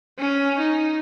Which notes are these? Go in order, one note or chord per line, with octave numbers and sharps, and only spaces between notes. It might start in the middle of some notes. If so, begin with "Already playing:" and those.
C#4
D#4